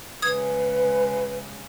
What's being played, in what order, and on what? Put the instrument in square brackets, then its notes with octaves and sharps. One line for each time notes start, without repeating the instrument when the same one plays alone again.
[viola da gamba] C#3 G#3 [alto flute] B4 [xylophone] D#6 G#6